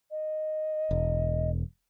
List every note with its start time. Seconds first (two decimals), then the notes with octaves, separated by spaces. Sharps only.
0.11 D#5
0.91 E1